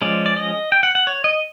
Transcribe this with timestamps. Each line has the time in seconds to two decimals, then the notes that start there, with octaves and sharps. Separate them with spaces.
0.02 F3 G#3 C#4 D5
0.26 D5
0.37 D#5
0.72 G5
0.83 F#5
0.95 F#5
1.07 C#5
1.24 D#5